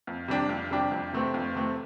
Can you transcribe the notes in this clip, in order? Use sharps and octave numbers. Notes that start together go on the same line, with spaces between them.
F2
C3 G3 D4 G4
F2
C3 G3 D4 G4
F2
C3 A3 C4
F2
C3 A3 C4